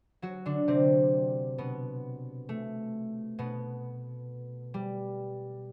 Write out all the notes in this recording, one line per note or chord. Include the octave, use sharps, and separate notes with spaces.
F#3 F#4
D3 D4
C3 C4
B2 B3
A3
B2 B3
G3